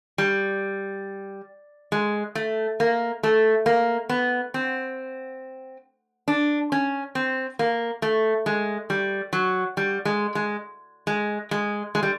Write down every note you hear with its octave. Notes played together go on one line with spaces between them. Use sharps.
G3
G#3
A3
A#3
A3
A#3
B3
C4
D4
C#4
C4
A#3
A3
G#3
G3
F#3
G3
G#3
G#3
G#3
G#3
G#3
G3